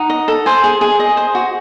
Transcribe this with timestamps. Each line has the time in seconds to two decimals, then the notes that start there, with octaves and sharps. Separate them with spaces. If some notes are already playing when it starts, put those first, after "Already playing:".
Already playing: D#4 F#5
0.10 D#5
0.28 A4
0.46 C5 G#5
0.64 G#4
0.81 G#4
1.00 D#5
1.17 C5
1.35 F#4